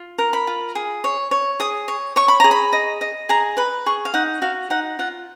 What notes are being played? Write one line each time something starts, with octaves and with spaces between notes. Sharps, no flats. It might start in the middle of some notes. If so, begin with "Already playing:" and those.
Already playing: F4
A#4
B5
F4
G#4
C#5
C#5
G#4 D#6
C#5
C#5 C#6
B5
G#4 A#5
B5
D#5
D#5
G#4 A#5
B4 B5
G#4 C#6
F5
D#4 F#5
F#4 F5
D#4 F#5
F4 F#5